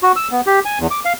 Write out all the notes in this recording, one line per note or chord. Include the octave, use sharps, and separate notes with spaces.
F#4
E6
B3
G4
G#5
E2
D6
F5